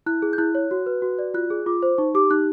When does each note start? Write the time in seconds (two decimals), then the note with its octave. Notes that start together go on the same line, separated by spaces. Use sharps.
0.06 E4 F#6
0.22 G#4
0.33 G6
0.38 E4 F#6
0.55 C#5
0.71 F#4
0.86 B4
1.02 F#4
1.19 D5
1.34 F4 F#6
1.50 G#4
1.66 F4 D6
1.82 C5
1.98 D#4 C#6
2.15 G4 D6
2.31 D#4 F#6